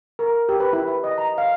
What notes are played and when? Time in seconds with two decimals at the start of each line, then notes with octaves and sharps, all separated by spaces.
0.19 A#4
0.49 G4
0.60 B4
0.73 E4
0.88 B4
1.04 D#5
1.18 A#5
1.38 F5